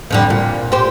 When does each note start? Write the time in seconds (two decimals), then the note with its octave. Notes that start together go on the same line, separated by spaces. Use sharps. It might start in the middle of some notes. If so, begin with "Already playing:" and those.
0.10 F2 D3 G3
0.30 A#2
0.72 G4 C5